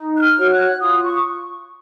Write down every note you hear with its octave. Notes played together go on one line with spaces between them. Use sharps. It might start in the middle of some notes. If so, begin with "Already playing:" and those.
Already playing: D#4
F#6
F6
F#4 C#5
F#6
F4 D#6
C#6